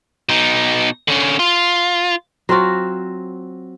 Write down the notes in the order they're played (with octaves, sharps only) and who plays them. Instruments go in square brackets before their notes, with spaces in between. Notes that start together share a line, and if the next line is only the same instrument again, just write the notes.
[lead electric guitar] B2 D#4
D3 C#4
F4
[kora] F#3 C4 F4 F#4